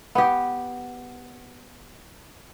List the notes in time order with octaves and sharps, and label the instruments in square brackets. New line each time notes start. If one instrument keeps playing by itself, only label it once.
[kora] B3 G4